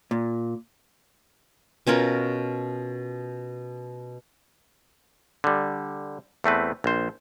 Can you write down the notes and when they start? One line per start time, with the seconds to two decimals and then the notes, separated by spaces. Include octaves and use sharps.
0.11 A#2
1.87 B2 C#4 F4 A#4
5.44 D3 G3
6.44 E2 A3 C4 B4
6.84 A#1 C5